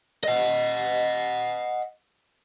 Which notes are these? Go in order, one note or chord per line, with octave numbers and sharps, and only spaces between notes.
D#5 F#5